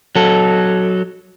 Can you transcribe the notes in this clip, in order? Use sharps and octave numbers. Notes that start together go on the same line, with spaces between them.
F#3 A4